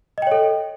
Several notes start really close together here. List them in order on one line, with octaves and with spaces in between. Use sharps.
D#5 G5 C#5 A4